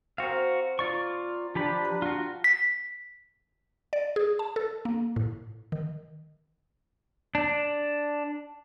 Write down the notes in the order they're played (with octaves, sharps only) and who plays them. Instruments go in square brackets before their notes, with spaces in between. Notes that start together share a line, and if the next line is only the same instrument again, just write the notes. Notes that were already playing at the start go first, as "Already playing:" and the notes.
[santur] C4 A#4 [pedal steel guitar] F#4 F5
[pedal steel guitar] F4 D5 C#6
[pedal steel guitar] F3 G4 B5 [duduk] D4
[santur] G3 B4 A#5
[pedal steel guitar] F4 F#4
[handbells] B6
[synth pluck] D5
G#4
A5
A4
A#3
A2
D#3
[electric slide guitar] D4